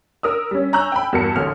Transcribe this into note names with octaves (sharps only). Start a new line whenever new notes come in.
A#4 D#6 E6
G3 C#4
G#5 A#5 C#6 E6 F#6 G6
G5 G#5 B5
E2 G2 F#4 A#4 A5 C#7
A1 D3 F6